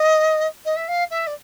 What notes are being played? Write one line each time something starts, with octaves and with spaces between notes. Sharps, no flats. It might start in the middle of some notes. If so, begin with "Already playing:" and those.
Already playing: D#5
D#5
E5
F5
E5
D5